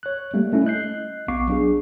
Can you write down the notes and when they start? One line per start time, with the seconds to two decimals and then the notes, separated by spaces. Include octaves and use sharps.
0.03 C#5 F#6
0.34 G3 A3 A#3
0.53 A3 C#4 E4
0.65 D#5 F#6 G6 C7
1.28 A#1 B3 F5 C#6 D6 C7
1.48 F#3 D4 G#4